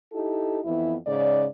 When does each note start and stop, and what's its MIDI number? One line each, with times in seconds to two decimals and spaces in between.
0.13 0.60 63
0.13 0.60 64
0.13 0.60 67
0.13 0.60 69
0.65 0.95 41
0.65 0.95 52
0.65 0.95 59
0.65 0.95 64
1.07 1.45 44
1.07 1.45 49
1.07 1.45 74